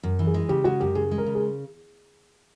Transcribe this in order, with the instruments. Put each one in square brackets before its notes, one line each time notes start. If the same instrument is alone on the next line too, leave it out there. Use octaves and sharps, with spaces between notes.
[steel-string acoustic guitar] F#2
E3
[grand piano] G#4
[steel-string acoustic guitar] G#3
[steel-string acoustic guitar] C#3 [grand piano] G4
[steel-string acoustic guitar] G#3 [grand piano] F#4
[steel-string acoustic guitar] F#2 [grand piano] G4
[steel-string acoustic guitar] C#3 [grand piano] G#4
[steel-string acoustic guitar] G#3
[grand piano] A#4
[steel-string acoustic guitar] C#3
[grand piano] G#4